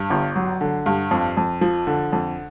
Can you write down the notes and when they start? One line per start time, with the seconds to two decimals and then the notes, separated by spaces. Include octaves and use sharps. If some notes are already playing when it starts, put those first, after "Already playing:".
Already playing: G2
0.10 G1
0.36 F#3
0.61 D3
0.86 G2
1.11 F2
1.37 F2
1.61 F3
1.87 D3
2.13 F2